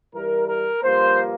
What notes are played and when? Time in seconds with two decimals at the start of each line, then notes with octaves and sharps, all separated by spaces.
0.14 G2 E3 G3 A#4
0.49 A#4
0.84 G2 F3 A#3 C5